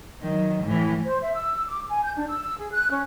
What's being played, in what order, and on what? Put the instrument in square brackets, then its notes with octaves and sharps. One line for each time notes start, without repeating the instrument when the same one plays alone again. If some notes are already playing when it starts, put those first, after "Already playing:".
[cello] D#3 F#3
A2 E3
[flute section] C5
E5
E6
D6
G#5
G6
D4
E6
E6
G#4
F#6
C#4